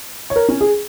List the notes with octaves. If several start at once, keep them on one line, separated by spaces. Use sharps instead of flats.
C#5
A#4
C#4
G#4